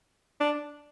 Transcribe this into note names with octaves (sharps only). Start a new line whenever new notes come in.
D4